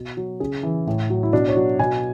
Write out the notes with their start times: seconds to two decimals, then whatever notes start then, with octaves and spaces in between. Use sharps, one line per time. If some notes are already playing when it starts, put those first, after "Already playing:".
Already playing: B2
0.17 F#3
0.40 C#3 G#4
0.63 E3
0.87 A2
1.10 F#3
1.23 E4
1.33 B2 D4
1.48 C#5
1.56 F#3
1.79 B2 G#5